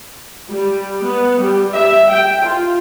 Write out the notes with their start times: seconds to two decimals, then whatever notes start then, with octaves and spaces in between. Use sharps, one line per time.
0.51 G3
1.04 B3
1.40 G3
1.74 E5
2.10 G5
2.44 F4